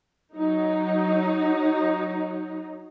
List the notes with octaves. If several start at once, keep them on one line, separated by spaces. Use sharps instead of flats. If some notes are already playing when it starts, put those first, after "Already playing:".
F#3 D#4